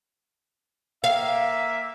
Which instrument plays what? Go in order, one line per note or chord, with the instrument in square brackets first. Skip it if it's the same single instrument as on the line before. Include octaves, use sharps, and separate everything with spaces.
[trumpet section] A#3 E5 [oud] F5